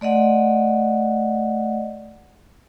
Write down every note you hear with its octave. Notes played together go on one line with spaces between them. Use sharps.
A3 D5 D#5 F#5